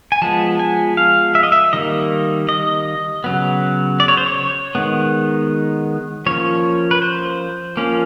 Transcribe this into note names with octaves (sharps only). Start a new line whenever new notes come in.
G#5
F3 G#3 B3 A5
G#5
F5
E5
D#5
E5
D#3 G3 A#3 D#5
D#5
C#3 F#3 B3
D5
C#5
C5
C#5
D#3 G#3 B3
F3 A#3 C#4 C#5
B4
C5
F3 A#3 C#4